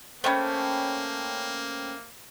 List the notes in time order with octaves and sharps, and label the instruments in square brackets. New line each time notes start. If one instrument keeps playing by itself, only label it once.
[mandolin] A3 C#4 [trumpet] A#3 [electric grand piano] C5 G5 B5